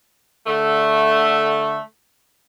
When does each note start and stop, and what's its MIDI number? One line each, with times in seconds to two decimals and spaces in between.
0.47 1.78 50
0.47 1.78 57